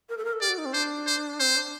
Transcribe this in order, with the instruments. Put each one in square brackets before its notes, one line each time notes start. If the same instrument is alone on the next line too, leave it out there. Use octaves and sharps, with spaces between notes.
[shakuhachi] A#4
A4
A#4
A4
[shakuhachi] G4 [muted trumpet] D5
[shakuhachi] F#4
D#4
C4
[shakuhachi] D4 [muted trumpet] C5
[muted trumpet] C5
[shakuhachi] C4 [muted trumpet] C5
[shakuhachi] D4